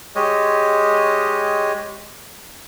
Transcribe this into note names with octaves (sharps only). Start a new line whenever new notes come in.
G#3 G4 C#5 D#5